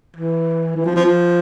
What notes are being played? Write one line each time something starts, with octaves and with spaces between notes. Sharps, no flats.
E3
E3
F3
F3
F3